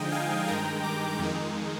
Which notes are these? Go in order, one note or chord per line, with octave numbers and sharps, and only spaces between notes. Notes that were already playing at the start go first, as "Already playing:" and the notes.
Already playing: D3 F3 G#3 D#4 D#5 G5
F5 G#5
G2 D#3 G#3 G5 A#5
A#5 D6
F2 D#3 G#3 D#4